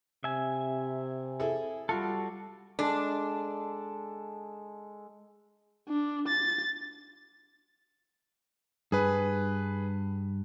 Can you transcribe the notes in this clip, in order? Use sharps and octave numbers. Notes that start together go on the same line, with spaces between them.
C3 E5 G#5
E4 G#4 A4
G3 F4 F#4 A4
G#3 D4 A4
D4
A6
G2 G#4 B4